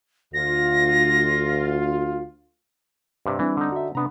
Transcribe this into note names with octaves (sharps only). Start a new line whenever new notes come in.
D2 F4 A#6
G2 C3
E3 G3 C4 D4
D3 D#4
F#4 E5
C3 B3 D4 A#5